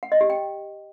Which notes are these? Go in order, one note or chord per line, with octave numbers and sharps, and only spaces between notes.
F#5
D#5
G4
G5